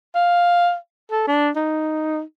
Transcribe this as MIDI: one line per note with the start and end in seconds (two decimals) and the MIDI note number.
0.15 0.75 77
1.11 1.25 69
1.27 1.50 62
1.56 2.21 63